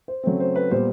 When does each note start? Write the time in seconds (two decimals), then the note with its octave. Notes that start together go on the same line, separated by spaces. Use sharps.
0.08 C5
0.24 C#3 F#3 A3 C4
0.40 C5
0.56 B4
0.71 A#2 G3 B3 C5